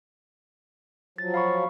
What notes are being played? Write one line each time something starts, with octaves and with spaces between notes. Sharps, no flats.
F3 F#3 A6
F5 B5 C#6